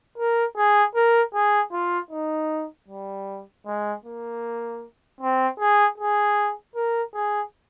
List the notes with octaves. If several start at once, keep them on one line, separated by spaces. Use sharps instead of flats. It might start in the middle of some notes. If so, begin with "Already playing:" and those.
A#4
G#4
A#4
G#4
F4
D#4
G3
G#3
A#3
C4
G#4
G#4
A#4
G#4